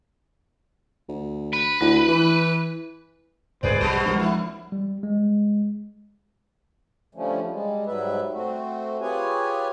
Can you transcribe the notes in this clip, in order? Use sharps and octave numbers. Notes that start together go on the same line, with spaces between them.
D2
B4
D2 E4
E3
D2 G#2 C3 G#4 B4 C5 D5
B1 B2 G3 B3
F3 G#3 D4 F#4 A#4 B4
E4
G3
G#3
D3 F3 G3 A3 C#4
G3 G#3
G#2 F#3 G3 B4 E5
A3 C4 F#4
F4 G4 G#4 B4 C#5 G#5